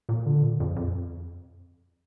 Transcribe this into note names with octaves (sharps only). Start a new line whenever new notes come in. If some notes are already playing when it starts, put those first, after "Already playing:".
A#2
D3
A#2
F2
F2